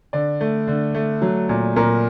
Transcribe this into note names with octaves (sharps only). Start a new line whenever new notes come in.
D3 D5
A3
D3
A3
F#3
A#2
A#2 A#4